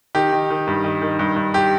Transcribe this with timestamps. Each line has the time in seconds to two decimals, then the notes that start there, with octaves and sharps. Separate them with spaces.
0.15 D#3 G4
0.32 D#3
0.50 D#3
0.67 G2
0.84 D#3
1.02 D#3
1.19 G2
1.36 G2
1.54 G4